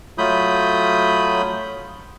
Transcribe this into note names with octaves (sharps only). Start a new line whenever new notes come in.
F#3 A3 F4 B5 D#6 G6